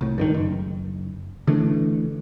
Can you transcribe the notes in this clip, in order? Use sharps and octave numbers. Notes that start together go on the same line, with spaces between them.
C2 A2
G2 D3 D#3
F#1
D3 E3 A3 D4